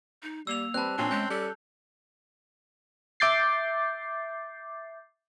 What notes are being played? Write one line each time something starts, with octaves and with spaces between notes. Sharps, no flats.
D#4
G3 A#3 E6 F7
G3 C4 B4 A5 F#6
A#2 C4 D4 C#5 G#5
G#3 C#4 G6
G3 A4
E5 D6 G6 A6 C7